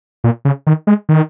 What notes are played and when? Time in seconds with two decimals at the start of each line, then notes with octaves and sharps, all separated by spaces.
0.24 A#2
0.45 C#3
0.67 D#3
0.87 G#3
1.09 D#3